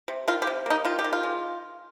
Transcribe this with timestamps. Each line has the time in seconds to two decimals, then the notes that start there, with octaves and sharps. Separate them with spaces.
0.08 C3
0.28 D#3 F4
0.42 G4
0.47 C3
0.66 A#3 D#4
0.85 D#3 F4
0.99 G4
1.04 D#3
1.13 F4
1.23 G#3